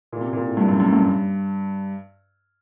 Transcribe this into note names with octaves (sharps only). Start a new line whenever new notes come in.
A#2
C3
A#2
A2
G2
F#2
F#2
G2